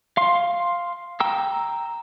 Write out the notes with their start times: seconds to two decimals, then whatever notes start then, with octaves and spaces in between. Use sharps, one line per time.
0.17 F5 C6
1.20 G5 A#5 E6